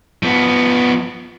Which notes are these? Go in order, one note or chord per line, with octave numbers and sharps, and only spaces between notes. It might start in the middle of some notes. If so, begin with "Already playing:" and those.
F3 B3